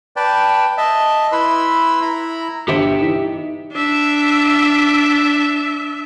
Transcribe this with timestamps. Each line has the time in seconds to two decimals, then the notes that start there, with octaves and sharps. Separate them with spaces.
0.16 B4 D5 G5 A5
0.78 D#5 E5 A5
1.32 E4 B4 B5 C6 E6
2.02 E4 A#5 B5
2.68 G1 G4 E5
3.00 E3 D#4
3.72 D4 E5